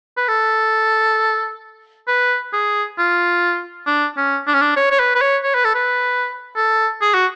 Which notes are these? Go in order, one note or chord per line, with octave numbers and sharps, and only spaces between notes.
B4
A4
B4
G#4
F4
D4
C#4
D4
C#4
D4
C#5
C#5
B4
B4
C#5
C#5
B4
A4
B4
A4
G#4
F#4